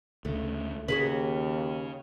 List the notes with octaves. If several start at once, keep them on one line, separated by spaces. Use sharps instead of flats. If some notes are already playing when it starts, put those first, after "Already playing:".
D2 C#3 A3
D#2 C#3 F#4 G#4 B4